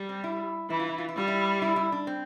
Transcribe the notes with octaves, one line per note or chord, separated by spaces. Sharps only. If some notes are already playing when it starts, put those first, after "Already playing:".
Already playing: G3
C4
E4
E3 E4
F4
E4
F4
E4
G3 F4
E4
E4
E4
D4
C4